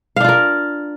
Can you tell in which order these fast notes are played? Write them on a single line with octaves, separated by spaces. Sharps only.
F5 D4 F4 A#4